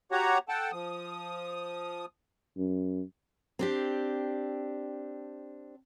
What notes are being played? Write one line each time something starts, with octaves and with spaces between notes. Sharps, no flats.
F#4 G4 C#5 F#5 A#5
A4 F#5 G5 A5
F3 D#6
F#2
C4 D4 G4